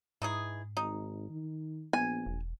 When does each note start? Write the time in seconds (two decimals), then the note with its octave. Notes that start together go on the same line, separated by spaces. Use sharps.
0.22 G#2 E3 D#4 G#4
0.77 G#1 D#4
1.29 D#3
1.93 A#1 B3 G#5
2.27 E1